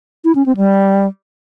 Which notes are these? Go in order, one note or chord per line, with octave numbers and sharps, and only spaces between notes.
E4
C#4
C4
G3